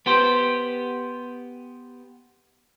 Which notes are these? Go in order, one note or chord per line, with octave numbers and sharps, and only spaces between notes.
B3 G4 C5